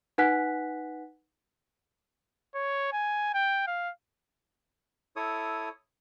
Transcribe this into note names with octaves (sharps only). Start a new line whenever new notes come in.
D#4 B4 F#5 G#5 F#6 B6
C#5
G#5
G5
F5
E4 A4 C#5 D#6